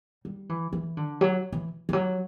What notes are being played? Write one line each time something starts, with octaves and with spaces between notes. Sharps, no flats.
G3
E3
E3
D3
F#3
E3
E3
F#3